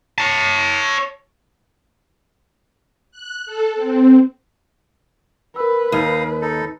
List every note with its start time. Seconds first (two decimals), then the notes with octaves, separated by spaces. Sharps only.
0.18 C#5 A5
3.12 F#6
3.46 A4
3.76 C4
5.56 A#4 B4 E6
5.92 D#2 D#4 F5 D#6
6.42 D#4 A4